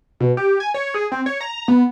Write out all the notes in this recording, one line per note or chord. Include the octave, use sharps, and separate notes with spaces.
B2
G4
G#5
C#5
G#4
C4
C#5
A#5
B3